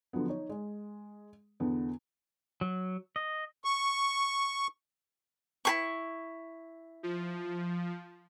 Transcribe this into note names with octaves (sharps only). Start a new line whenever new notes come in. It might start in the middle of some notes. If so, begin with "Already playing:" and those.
D3 F3 F#3 B3
D#4 C#5
G#3
E2 D3 B3
F#3
D#5
C#6
E4 G#4 C#6
F3